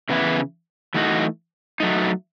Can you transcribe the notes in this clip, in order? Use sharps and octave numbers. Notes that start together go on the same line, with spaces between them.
C#3 E3 B3 E4
E3 A3 D#4 F#4
F#3 A3 D#4